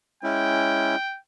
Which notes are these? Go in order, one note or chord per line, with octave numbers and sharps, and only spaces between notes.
G#3 C#4 E4 G5